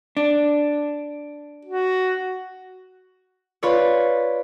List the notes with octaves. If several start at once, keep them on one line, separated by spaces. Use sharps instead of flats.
D4
F#4
F4 B4 C#5 D5